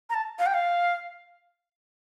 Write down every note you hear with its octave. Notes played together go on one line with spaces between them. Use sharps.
A#5
A5
F5
G5
F5